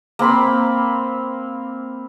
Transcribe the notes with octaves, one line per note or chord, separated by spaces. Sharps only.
A#3 C4 B5 C6